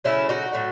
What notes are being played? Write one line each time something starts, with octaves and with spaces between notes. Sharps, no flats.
C#3 F#3 A3 C#4 E4
D#4 F#4
A2 F#3 A3